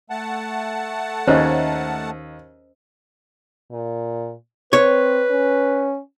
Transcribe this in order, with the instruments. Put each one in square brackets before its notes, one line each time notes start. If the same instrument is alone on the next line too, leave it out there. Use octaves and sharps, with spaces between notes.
[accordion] A3 F#5 A5
[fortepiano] D#2 [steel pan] C#4 [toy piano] C5 D#5
[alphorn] A#2
[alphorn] C4 [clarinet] B4 [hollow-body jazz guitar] C#5
[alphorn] C#4